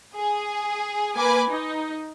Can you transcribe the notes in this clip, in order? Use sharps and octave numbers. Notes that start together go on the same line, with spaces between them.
G#4
A#3 B4 G#5 D6
D#4